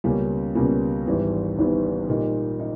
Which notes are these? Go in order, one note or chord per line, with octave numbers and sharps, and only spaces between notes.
C#2 B2 G3 A#3 C#4
C#2 B2 G3 A#3 C#4
G#1 G#2 E3 G3 B3
G#1 G#2 E3 G3 B3
A#2 G3 A#3 D#4
D#4